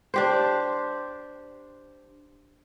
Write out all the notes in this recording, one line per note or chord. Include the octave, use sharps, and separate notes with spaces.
D4 G4 C5